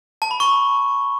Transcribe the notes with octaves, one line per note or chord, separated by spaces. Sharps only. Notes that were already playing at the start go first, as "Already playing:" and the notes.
A5
B5
C#6